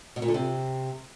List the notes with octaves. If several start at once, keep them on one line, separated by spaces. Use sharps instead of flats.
B2
A#2
D3
C3